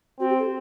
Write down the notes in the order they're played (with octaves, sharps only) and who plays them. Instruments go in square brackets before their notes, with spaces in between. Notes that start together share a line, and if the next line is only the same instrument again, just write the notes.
[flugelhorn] C4 [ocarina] F#4
[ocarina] G4
A4